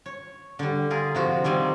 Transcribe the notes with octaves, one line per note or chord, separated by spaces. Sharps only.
C#5
D3 G3
F4 G#4 A#4
C3 F3 F#4
D#3 G3 C4 G#5